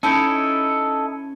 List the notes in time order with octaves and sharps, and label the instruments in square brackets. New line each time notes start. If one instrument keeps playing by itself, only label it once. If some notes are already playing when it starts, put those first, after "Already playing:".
[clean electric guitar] C#4 [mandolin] D#4 E4 A4